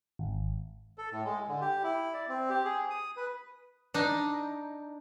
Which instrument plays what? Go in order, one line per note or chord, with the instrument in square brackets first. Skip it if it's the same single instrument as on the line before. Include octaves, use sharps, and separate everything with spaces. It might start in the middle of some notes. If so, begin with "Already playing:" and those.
[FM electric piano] G#1
[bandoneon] A4
A2
G#3
D3
G4
E4
D5
C4
G4
G#4
D#6
B4
[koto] D4 D#4